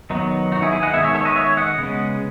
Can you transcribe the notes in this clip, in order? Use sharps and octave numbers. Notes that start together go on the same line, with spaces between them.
D#3 F#3 B3 D#4
D#4 F#4
E4 G#4
E4 G#4
D#5 F#5
D#3 G#3 B3 E5 G#5
C#5 E5
A4 C#5
B4 D#5
C#5 E5
D#5 F#5
C#3 G#3 B3